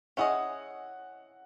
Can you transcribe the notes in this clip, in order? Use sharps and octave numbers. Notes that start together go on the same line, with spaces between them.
C#4 E4 G#4 D#5 F#5